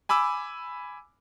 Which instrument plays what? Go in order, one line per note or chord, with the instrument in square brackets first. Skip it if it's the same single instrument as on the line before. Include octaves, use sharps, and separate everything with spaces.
[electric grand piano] G#5 B5 D6 E6